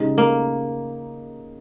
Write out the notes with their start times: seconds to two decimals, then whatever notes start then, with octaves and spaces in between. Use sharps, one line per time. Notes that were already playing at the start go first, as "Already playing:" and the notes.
Already playing: C#3 G#3 D#4 G4
0.18 A#3